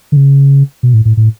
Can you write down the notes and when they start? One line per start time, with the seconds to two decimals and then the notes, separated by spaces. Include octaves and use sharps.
0.12 D3
0.17 C#3
0.83 B2
0.94 A2
1.05 A2
1.17 A2